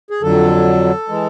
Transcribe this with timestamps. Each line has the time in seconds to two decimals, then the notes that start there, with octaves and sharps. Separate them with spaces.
0.10 G#4
0.22 F2 D3 F#3 A4
1.09 E3 G#3